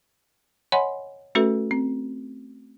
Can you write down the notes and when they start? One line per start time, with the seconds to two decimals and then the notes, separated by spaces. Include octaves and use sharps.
0.72 C#5 D#5 F#5 G#5 B5 C6
1.35 A3 C#4 F#4 A4 B4 E5
1.71 C4